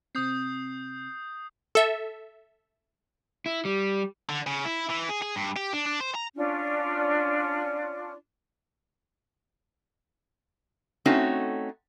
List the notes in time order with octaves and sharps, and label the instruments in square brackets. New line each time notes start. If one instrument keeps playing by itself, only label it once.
[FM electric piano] C3 C4 [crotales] D#6 G6 C7
[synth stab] A4 E5
[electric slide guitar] E4
G3
[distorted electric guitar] D3
C#3
E4
E3
G#4
G#4
G2
G4
D4
D4
C5
A#5
[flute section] C#4 D4 F4
[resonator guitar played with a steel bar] A3 C4 C#4 D#4 F#4